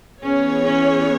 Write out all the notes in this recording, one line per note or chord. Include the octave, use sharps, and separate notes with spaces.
E3 B3 C#4 G#4 C#5
C#4